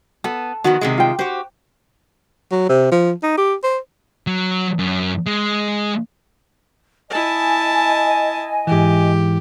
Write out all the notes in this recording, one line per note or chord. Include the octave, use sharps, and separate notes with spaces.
B3 A4
D#3 F3 B3 F#4
C3 D#3 G#3
F4 G5
F#4 G4 C5
F#3
C3
F3
D#4
G4
C5
F#3
F#2
G#3
E4 D#5 G#5 A5
G#2 E3 G4